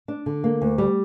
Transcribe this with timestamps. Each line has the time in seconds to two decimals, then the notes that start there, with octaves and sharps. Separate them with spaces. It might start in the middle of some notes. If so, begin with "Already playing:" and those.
0.08 D4
0.26 D3
0.44 A#3
0.62 D2
0.78 G3